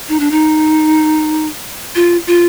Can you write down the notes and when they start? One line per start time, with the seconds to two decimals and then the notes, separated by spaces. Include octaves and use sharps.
0.09 D#4
0.20 D4
0.31 D#4
1.95 F4
2.27 F4